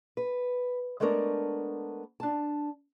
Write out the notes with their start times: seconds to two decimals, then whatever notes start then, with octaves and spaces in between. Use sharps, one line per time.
0.17 B4
1.00 G#3 A3 B3 D4 A#4 C#5
2.20 D4 A5